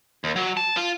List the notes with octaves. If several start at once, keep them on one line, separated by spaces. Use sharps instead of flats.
D#2
F#3
A5
F4